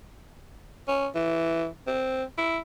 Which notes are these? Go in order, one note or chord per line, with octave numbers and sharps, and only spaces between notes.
C#4
E3
C4
E4